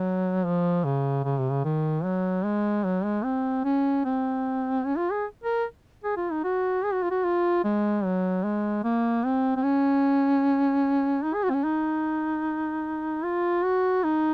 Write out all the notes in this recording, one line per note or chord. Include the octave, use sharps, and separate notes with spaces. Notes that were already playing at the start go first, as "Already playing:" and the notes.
Already playing: F#3
F3
C#3
C#3
C3
C#3
D#3
F#3
G#3
F#3
G#3
C4
C#4
C4
C#4
F4
G#4
A#4
G#4
F4
D#4
F#4
G#4
F#4
F4
F#4
F4
G#3
F#3
G#3
A#3
C4
C4
C#4
D#4
G#4
F#4
C4
C#4
D#4
F4
F#4
D#4